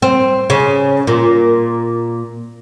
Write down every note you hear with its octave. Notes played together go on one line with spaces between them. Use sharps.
C4
C#3
A#2